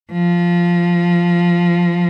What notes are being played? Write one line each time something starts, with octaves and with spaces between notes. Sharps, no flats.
F3